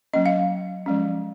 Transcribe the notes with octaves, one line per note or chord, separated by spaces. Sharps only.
F#3 A#3 C#4 D#5
F5
F3 G#3 C#4